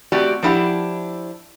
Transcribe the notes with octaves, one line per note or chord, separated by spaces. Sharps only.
A3 C4 F#4 G4 D5
F3 D4 E4 G4 F#5